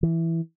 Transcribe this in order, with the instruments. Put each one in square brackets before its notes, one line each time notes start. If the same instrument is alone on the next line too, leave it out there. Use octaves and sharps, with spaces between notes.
[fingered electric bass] E3